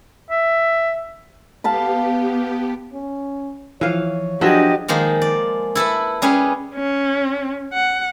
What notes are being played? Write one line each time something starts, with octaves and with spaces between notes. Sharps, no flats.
E5
B3 G4 F5 A5 B5
C#4
E3 F3 C#5 F5
F3 F#3 D4 G4 G#4 D#5 E5 G#5
D#3 F3 G#3 A#3
D5
E4 A4 B4 E5
G3 C#4 G#4 B4
C#4
F#5